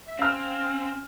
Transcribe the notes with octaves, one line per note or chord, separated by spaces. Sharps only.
E5
C4 C#4 F5 F6